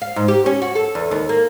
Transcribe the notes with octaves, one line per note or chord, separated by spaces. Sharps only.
F5
G#2
G4
C#4
F#4
A4
E2
D#2
A#3